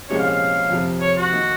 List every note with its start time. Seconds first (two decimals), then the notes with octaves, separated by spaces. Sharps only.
0.09 C2 A#2 F3 G#3 C#4 C#5
0.19 F5
0.30 F5
0.70 F2 C3 F3
1.00 C#5
1.17 F#4
1.31 D#3 A#3 D#4